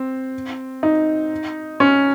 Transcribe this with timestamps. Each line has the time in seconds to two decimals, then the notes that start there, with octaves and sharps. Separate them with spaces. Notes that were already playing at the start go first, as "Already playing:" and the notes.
Already playing: C4
0.83 D#4
1.80 C#4